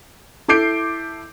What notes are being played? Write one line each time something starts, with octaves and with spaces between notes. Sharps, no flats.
E4 A4 D6 G6 C7 D7